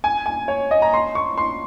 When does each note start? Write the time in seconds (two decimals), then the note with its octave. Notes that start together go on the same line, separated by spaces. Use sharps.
0.04 G#5
0.26 G#5
0.48 C#5
0.71 D#5
0.82 A#5
0.94 C6
1.15 C#6
1.38 C6